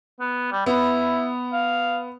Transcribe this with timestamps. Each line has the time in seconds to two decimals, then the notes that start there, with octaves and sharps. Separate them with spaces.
0.20 B3
0.52 G3
0.66 B3 E4
1.53 F5